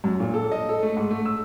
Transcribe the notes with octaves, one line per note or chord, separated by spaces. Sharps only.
F#2
A#2
A4
D#5
A4
A3
G#2
A3
E6